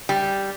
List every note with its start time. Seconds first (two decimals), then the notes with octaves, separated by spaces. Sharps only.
0.09 G3